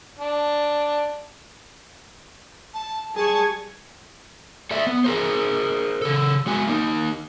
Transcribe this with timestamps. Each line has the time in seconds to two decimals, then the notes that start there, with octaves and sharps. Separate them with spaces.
0.20 D4
2.74 A5
3.16 G3 G#4 A5 C#6 G#6
4.71 A4 D5 E5
4.87 B3
5.04 G#4 A#4 C5
6.02 C#3 A4
6.46 G#3 F#4 G#5
6.67 A#3 D#4